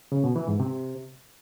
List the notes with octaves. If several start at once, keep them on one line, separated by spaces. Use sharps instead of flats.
C#3
B2
E3
G#2
C3